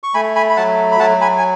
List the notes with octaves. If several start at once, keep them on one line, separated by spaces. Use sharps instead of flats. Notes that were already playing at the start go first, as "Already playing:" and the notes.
C#6
A3 G#5 B5
G#5 B5
B5
F#3 F#5 A5
B5
F#3 F#5 A5
G#5 B5
G#5